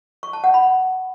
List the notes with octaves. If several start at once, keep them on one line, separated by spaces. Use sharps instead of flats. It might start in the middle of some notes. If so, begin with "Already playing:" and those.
C#6
A5
F#5
B5